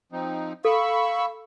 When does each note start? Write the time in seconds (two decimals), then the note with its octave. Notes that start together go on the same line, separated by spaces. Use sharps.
0.12 F3 C4 D#4
0.65 A4 F5 B5 C#6 E6